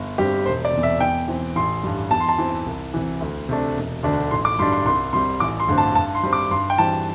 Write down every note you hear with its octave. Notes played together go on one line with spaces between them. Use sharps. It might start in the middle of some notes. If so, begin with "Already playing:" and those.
Already playing: G1
G2 G3 C4 G4
E1 C5
D5
E2 C3
E5
E2 G5
E3 C4
A1 C6
G2 G3
E2 A5
C6
A5
E3 C4
C2
C3 E3
D2
C3 A3 D4
E1
D2 D3 A3 D4
A1 C6
D6
G2 G3 D4 C6
C6
C2 C6
C3 G3 C6
A1 D6
C6
G2 D3 A3 C4
A5
G2 A5
C6
G3 C4
D6
G2 C6
G5
E3 G3 C4 A5